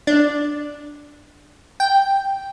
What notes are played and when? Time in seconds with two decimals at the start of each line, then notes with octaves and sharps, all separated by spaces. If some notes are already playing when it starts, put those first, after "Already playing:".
0.07 D4
1.80 G5